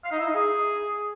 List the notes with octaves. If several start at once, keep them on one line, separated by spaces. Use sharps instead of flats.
F5
D#4
E4
D#4
G#4